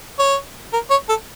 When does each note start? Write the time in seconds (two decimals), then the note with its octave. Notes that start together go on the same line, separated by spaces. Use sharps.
0.19 C#5
0.73 A#4
0.90 C#5
1.08 A4